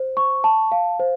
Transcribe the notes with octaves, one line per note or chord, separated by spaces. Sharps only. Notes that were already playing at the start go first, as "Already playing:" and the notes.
Already playing: C5
C#6
A5
F5
C5